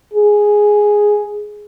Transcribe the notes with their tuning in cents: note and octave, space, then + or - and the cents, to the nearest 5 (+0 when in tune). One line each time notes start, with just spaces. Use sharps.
G#4 +0